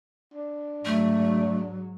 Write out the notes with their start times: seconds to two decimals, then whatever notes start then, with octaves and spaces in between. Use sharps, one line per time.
0.34 D4
0.85 G#2 F#3 A3